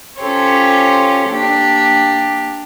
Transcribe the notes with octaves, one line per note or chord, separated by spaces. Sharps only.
C#4 F4 G4 A4 C5 C#5
A#3 D4 G4